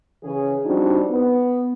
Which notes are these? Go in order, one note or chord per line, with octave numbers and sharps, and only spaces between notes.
C#3 E3 C#4 G#4
F3 G3 C4 D4 D#4 F#4
B3